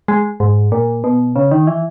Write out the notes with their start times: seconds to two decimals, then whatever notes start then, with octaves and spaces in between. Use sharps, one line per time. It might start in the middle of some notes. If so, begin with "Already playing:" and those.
0.08 G#3
0.40 G#2
0.72 A#2
1.04 B2
1.36 C#3
1.51 D#3
1.67 E3